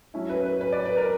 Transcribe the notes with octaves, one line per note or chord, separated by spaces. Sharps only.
F#3 C#4 E4
B4
B4
B4
D5
B4
A#4